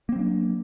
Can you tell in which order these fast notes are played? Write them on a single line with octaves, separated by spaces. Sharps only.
A#3 C4 F#3 D4